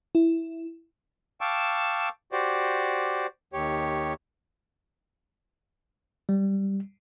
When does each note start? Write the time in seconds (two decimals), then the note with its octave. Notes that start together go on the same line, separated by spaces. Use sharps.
0.15 E4
1.41 F5 G5 A5 C#6 D6 E6
2.32 F#4 G4 C5 D5
3.53 D#2 G4 C#5
6.29 G3